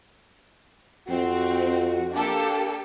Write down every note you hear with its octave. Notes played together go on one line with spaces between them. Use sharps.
F2 C4 F#4
A#3 D4 G4 A4